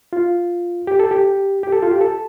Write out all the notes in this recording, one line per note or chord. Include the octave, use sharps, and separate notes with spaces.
F4
G4
A4
G4
G4
A4
F4
G4
A4